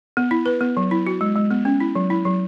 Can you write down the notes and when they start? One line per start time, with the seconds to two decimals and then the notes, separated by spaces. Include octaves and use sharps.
0.17 B3
0.31 E4
0.46 B4
0.61 B3
0.77 F#3
0.91 E4
1.07 F#4
1.21 G#3
1.36 G#3
1.51 B3
1.65 C#4
1.80 E4
1.95 F#3
2.10 E4
2.25 F#3